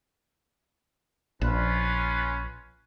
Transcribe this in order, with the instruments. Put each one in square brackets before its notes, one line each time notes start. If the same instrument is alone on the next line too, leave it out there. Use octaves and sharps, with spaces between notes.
[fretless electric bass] A#1 [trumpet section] C#4 F4 B4